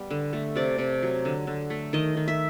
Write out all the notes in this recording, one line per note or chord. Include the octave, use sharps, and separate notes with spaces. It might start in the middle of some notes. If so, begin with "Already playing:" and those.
Already playing: G3 B3
D3
A3
C3 D5
C3
F#3
D3
D3
A3
D#3 D#5
D#3
E5